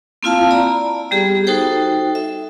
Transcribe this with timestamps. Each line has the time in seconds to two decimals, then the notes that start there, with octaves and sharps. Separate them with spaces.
0.23 A#3 C4 E4 F4 F5 A5
0.51 D5 A#5 B5
1.11 G3 B3 G4 G#4
1.47 D#4 F#4 A4 C5 G5
2.15 E5